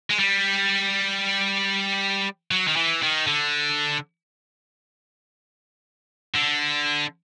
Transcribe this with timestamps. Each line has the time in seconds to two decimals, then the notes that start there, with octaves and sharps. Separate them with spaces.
0.10 G#3
0.19 G3
2.51 F#3
2.68 D#3
2.76 E3
3.03 D#3
3.27 D3
6.36 D3